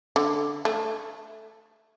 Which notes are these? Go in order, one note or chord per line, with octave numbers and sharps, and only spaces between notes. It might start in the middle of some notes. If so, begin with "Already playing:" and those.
D3
A3